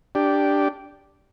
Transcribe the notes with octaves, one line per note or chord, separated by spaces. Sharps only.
D4 G4